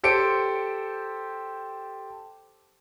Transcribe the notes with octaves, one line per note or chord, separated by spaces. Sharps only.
G4 A4 C5 C#7 D7